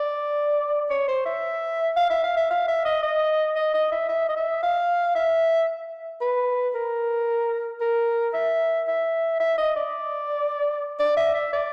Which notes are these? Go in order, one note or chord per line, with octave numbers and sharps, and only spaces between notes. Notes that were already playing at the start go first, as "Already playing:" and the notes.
Already playing: D5
C#5
C5
E5
F5
E5
F5
E5
F5
E5
D#5
D#5
D#5
D#5
E5
E5
D#5
E5
F5
E5
B4
A#4
A#4
E5
E5
E5
D#5
D5
D5
E5
E5
D5